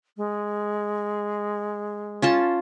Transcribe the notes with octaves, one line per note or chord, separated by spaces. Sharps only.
G#3
C#4 F4 A5